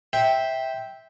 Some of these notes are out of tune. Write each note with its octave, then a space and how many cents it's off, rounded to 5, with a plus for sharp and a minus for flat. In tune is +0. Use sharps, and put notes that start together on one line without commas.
C5 +0 E5 -10 G5 +0